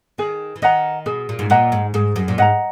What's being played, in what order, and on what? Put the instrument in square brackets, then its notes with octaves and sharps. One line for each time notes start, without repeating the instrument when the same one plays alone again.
[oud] D#3 [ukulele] G#4
[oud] E3
[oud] D#3 [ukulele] D#5 F#5 A#5
[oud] B2 [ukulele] G#4
[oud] A#2
G#2
[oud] A#2 [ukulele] D#5 F#5 A#5
[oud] G#2
[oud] G#2 [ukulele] G#4
[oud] F#2
A#2
[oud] G#2 [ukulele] D#5 F#5 A#5